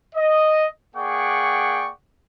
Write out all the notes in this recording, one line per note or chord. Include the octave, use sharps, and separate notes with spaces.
D#5
A#3 G#4 D5 F#5 G5 C#6